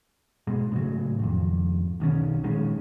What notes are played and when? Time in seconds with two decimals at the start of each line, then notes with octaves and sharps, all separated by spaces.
0.47 G#2 B2 G#3
0.72 A2 C#3 E3 F#3
1.19 G#1 F2
2.00 B1 D#3 G3 C#4
2.44 A#1 D#3 G#3 C#4